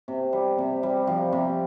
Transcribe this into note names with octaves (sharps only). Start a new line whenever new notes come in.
C3
G3
C3
G3
F3
C3